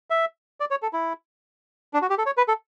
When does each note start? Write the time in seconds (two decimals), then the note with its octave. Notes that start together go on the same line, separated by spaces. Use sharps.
0.10 E5
0.60 D5
0.71 C#5
0.82 A4
0.93 E4
1.93 D4
2.02 F#4
2.10 G4
2.18 A4
2.26 C#5
2.37 B4
2.48 A4